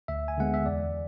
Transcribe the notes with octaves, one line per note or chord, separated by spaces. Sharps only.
D2 E5
G#5
D3 G#3 B3 F#5
E5
E2 D5